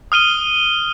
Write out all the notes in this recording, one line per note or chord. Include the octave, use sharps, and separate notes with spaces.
D#6 F6 D#7 G7